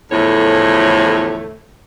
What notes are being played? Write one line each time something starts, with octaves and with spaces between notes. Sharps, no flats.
E2 A2 D3 F3 A3 C#5